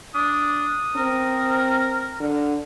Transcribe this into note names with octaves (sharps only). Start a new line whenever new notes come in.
D4 D#6
C4 A#4
D3